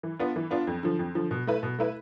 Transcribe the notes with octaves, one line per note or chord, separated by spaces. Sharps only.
E3
B3 D4 F4
E3
B3 D4 F4
F2
D3 F3
F2
D3 F3
B2
A3 E4 B4
B2
A3 E4 B4